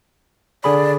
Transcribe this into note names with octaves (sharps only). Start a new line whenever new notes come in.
D3 G#4 D5 B5